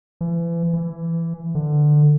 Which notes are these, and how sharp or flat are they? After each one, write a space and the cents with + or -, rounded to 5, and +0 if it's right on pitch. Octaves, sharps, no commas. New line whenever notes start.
E3 +35
E3 +15
D3 +15